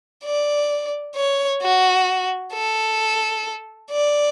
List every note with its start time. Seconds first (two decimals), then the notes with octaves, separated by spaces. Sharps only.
0.24 D5
1.16 C#5
1.61 F#4
2.53 A4
3.91 D5